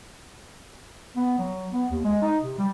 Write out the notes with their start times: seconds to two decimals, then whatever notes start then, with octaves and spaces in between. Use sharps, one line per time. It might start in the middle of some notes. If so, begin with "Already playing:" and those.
1.16 B3
1.39 F#3
1.72 B3
1.91 D#2
2.04 G#3
2.22 D#4
2.42 C3
2.58 G3